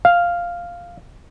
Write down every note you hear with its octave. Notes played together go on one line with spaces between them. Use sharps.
F5